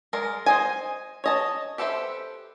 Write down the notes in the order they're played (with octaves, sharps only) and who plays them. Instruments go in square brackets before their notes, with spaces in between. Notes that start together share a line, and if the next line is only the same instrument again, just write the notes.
[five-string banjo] G#3 A#4 D5
C5 D#5 G#5
C#5 D#5 A5
G4 A4 B4 C5 E5